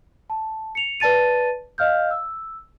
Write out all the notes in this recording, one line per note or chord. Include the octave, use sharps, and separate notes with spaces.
A5
C#7 F7
B4 D5 A5 A6 D#7
D#5 F5 F6 G6
E6